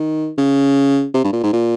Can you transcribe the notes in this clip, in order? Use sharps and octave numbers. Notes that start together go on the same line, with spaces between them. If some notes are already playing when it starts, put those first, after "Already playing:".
Already playing: D#3
C#3
C3
G2
A#2
G#2
A#2